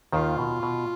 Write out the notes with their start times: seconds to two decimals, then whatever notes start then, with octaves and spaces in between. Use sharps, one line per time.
0.12 D#2 D#3 F4
0.38 B2
0.63 B2